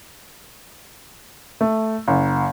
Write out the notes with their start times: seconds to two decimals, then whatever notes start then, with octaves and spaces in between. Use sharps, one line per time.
1.61 A3
2.08 F#1